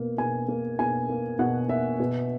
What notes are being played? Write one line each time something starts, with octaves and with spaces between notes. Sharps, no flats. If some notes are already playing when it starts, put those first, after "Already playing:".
Already playing: B2 A#3
B2 G#5
A#3
B2 G#5
A#3
B2 F#5
A#3 E5
B2